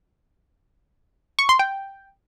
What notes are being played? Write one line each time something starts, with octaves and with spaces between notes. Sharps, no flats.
C#6
C6
G5